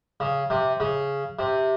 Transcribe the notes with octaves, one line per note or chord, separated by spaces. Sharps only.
C#3
C3
C#3
C3